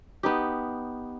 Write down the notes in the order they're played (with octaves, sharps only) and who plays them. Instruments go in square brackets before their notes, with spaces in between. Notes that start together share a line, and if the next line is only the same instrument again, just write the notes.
[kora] B3 D#4 G4